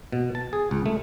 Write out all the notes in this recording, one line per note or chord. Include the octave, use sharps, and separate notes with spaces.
B2
A5
G#4
C#2
A3